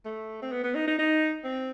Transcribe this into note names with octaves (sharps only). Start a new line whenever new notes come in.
A3
C4
B3
B3
D#4
D#4
D#4
C4